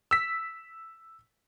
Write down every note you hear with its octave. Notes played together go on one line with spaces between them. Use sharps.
E6 B6